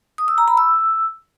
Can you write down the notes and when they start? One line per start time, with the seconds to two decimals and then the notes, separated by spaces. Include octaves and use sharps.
0.18 D#6
0.28 E6
0.38 A#5
0.48 B5
0.57 E6